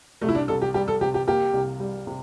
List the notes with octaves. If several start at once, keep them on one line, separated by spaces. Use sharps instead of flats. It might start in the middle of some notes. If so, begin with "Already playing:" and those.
C2 A3
E4
D4
C2 A4
G4
G3 G4
A4
C3 G4
G4
A#3 G4
C2
G3
C3